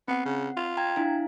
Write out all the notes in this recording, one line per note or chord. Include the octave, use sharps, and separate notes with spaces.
B3 C4 F#5
C#3
F4
G5 A#5 G#6
D4 E4 F5